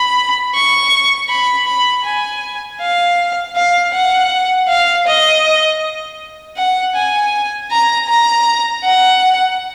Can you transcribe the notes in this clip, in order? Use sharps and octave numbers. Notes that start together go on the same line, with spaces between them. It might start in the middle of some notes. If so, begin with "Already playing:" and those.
Already playing: B5
C#6
B5
B5
G#5
F5
F5
F#5
F5
D#5
F#5
G#5
A#5
A#5
F#5